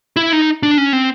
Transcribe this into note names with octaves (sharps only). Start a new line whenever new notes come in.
E4
D#4
D4
C#4
C4